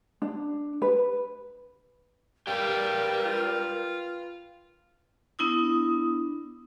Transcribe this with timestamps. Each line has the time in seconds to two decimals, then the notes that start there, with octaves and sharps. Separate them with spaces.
0.22 D4
0.82 B4
2.47 G3 G4 A#4 B4 F5 G5
3.25 F4
5.39 B3 D4 E4 D#6